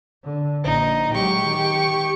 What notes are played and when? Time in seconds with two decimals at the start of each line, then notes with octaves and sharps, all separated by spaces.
0.24 D3
0.64 A#1 D#4
1.13 F#3 G#3 G4 C#6
1.47 D#3